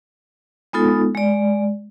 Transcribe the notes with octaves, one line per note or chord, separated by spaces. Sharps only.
G#3 B3 D#4 F4 A4
G#3 D5